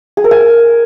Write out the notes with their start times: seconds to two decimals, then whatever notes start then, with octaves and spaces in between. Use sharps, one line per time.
0.17 G#4
0.24 A#4
0.31 G#5